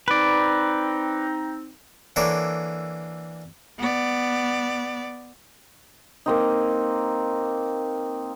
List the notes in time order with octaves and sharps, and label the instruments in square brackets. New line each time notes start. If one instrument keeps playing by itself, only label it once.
[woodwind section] C4 D#4 [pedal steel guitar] B4 D5
[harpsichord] D3 E3 A#3 A4 C#5 D5
[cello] B3 D5
[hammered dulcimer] A#3 C4 D#4